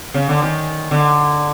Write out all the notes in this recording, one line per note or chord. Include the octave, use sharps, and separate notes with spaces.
C#3
D3
D#3
D3